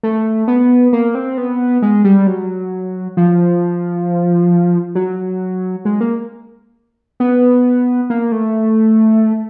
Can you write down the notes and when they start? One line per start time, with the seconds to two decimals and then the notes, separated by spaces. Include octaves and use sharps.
0.03 A3
0.48 B3
0.93 A#3
1.15 C4
1.38 B3
1.82 G#3
2.04 G3
2.27 F#3
3.17 F3
4.95 F#3
5.85 G#3
6.01 A#3
7.20 B3
8.10 A#3
8.32 A3